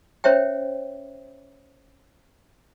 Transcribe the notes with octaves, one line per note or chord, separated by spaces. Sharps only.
C#4 C5 C#5 E5 G5